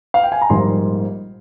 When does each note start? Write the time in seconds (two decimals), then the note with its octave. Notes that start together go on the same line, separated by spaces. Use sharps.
0.14 F5
0.23 G5
0.32 G#5
0.42 A#5
0.50 A#1 G#2 G3 A#3 C6